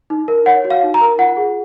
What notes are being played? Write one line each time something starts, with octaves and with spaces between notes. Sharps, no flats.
D#4
A#4
C#5 F#5
F#4
F5
D#4
A#5
A#4
F4 F#5
G#4